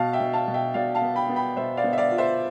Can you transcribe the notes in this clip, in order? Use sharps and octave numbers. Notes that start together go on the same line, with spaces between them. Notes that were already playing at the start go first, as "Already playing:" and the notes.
Already playing: B2 F5 A5
E5 G5
B2
F5 A5
B2
E5 G5
B2 D5 F5
F5 A5
B3
G5 B5
B3
G5 B5
B2 C5 E5
D5 F5
B3
E5
D5 F5
F4
C5 E5